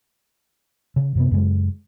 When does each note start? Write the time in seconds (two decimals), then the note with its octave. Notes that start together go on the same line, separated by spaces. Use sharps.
0.96 C#3
1.15 F#2 C3 B3
1.31 F#2 C#3 G#3